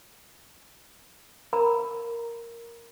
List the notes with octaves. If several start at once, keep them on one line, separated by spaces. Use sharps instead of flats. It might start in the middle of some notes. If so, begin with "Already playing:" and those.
A#4 A#5 B5